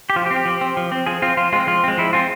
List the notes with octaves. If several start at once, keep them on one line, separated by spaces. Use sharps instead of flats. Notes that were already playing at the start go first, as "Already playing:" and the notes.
G4
F3 F4
G4
C4
G4
F3
C4
F3
C4
F3 G#4
C4 F4
F3 F4
G#3 C4 F4
F3 F4
G#3 C4
F3 E4
G#3 C4 F4